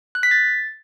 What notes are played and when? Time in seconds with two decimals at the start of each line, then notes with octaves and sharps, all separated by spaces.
0.15 F#6
0.23 B6
0.31 A6